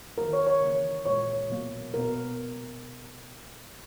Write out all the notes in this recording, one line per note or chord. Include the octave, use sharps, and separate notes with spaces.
D#3 F#3 A#3 A#4
C#5
C#5
C#3 E3 A#3
A#2 G#3 C#5
B2 F#3 A#3
B2 F#3 A#3 A#4